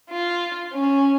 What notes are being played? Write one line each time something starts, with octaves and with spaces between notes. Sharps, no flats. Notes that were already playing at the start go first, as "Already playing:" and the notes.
F4
C#4